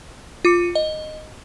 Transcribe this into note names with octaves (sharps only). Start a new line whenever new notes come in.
F4 D6 C#7
D#5